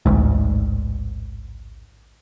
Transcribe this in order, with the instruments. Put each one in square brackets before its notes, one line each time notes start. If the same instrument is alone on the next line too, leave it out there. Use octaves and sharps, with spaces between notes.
[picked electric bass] A1 D2 G#2